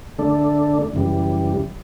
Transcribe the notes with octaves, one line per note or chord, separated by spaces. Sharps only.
D3 A3 D4
F#2 C#3 E3 G3